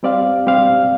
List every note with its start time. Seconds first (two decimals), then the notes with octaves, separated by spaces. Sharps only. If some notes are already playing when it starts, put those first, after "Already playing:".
0.03 G3 C4 G4 D5 F5
0.47 G3 C4 G4 D5 F5